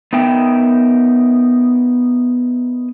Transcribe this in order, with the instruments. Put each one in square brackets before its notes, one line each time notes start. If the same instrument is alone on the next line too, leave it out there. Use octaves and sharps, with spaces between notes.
[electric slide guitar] B3 D#4 A#4 E5 G5